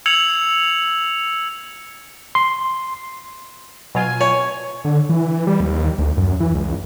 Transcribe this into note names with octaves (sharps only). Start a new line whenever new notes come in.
E6 G#6 C#7 F7 F#7
C6
B2 F#3 F4 G#5
C#5
D3
E3
G3
D#2
D2
F#2
E3
C#2